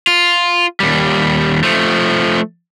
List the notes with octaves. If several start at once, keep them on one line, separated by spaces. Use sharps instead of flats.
F4
D#2 G3
F3 A3